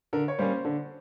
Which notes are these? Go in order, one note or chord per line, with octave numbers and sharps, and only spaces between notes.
D3 A#4
C#5
G3 A#3 C#4 C5
D3